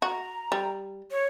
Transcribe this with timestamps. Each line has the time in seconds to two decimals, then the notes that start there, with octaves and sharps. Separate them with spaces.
0.02 F#4 A#5
0.52 G3
1.11 C#5